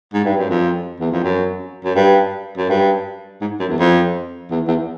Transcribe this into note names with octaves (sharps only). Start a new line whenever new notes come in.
G#2
G2
F#2
F2
E2
F2
F#2
F#2
G2
F#2
G2
G#2
F#2
E2
F2
E2
E2